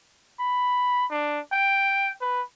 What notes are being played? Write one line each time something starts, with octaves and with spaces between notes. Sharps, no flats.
B5
D4
G5
B4